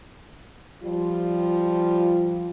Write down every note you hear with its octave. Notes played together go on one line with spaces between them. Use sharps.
F3 G3 F4